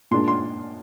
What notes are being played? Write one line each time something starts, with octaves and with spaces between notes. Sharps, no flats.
A#2 G#3 D4 C6
C6